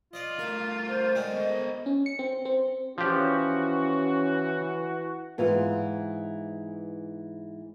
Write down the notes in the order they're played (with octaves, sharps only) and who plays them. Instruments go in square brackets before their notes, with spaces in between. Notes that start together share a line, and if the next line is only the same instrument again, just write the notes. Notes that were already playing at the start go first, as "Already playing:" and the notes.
[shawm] F4 [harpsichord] D5 D#5
[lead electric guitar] A3 A#4 [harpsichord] F5
[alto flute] C5
[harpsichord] D#3 G#3 C4 [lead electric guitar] A4 D5
[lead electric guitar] B3 A4 [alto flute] D#5
[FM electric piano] C#4
C#7
C4
C4
[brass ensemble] E3 F#4 [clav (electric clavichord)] F3 G4 [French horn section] C#4
[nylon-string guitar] G#2 E3 B3 F4